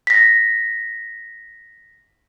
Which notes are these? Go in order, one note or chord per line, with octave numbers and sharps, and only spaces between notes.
A#6 B6